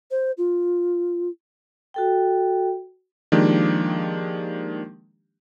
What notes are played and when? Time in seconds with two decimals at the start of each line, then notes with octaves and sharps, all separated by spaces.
0.11 C5
0.37 F4
1.94 F#4 A4 G5
3.32 D#3 F3 G#3 A#3 D4 G4